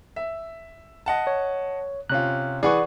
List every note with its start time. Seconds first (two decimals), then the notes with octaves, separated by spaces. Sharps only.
0.16 E5
1.06 D#5 F#5 A5
1.27 C#5
2.10 C3 C#4 F4 F#6
2.63 E3 G#4 B4 D5 F#5 C#6